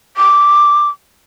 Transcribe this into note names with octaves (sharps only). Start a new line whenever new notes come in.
D6